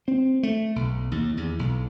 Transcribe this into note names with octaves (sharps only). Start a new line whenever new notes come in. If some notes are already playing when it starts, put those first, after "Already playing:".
C4
A3
B1
D#2
E2
B1